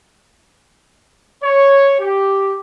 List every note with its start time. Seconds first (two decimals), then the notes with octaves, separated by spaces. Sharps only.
1.44 C#5
2.00 G4